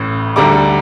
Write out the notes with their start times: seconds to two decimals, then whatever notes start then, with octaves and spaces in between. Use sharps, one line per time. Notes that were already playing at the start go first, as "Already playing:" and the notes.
Already playing: A1 A2
0.36 D2 D3 G3 A#5 D6